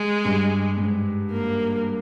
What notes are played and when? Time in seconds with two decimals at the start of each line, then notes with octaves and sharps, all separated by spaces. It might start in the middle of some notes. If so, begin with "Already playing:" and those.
Already playing: G#3
0.25 G2
0.77 G#2
1.31 A#3